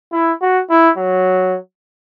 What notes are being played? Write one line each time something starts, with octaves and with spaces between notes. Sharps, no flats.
E4
F#4
E4
F#3